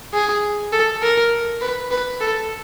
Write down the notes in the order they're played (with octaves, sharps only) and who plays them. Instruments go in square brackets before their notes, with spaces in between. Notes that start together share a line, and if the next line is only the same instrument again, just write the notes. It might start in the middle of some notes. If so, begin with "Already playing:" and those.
[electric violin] G#4
A4
A#4
B4
B4
A4